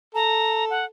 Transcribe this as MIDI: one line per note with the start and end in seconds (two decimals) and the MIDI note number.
0.15 0.87 69
0.15 0.65 82
0.70 0.85 78